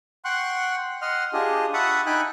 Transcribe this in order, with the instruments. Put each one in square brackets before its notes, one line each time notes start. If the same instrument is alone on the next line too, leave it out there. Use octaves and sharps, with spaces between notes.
[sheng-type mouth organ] F#5 G5 C6 C#6 F#6
D#5 F#5 C6 F6
D4 F4 G4 G#4 D#5
E5 F#5 A5 B5 C#6 D#6
D#4 G5 G#5 B5 F#6